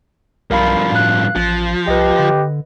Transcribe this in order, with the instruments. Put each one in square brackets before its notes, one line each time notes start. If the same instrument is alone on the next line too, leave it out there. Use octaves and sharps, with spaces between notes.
[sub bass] B1 [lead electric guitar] G2 F3 [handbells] A#4 F5 B5
[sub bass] A2 [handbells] F5 F#6
[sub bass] A1 [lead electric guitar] F3
[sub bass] C2 [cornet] G4 [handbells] B4 D#5
[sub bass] D3